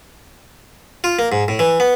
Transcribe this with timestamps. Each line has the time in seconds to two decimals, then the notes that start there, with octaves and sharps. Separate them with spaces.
1.04 F4
1.19 A#3
1.32 G#2
1.48 A2
1.59 E3
1.80 B3